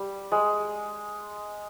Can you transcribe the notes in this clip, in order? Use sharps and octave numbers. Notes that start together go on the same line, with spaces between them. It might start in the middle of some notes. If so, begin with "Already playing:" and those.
Already playing: G3
G#3